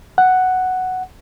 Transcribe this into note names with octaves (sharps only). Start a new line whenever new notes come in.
F#5